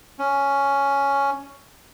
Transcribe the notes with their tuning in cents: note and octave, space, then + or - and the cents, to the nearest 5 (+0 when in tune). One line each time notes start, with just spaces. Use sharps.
C#4 +5